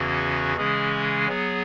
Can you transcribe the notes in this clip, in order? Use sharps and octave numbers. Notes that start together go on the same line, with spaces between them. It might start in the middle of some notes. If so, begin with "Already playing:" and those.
Already playing: E2 C#3 E3 C#4 F#4
C#3 E3 G#3 C#4 G#4
F#3 B3 G#4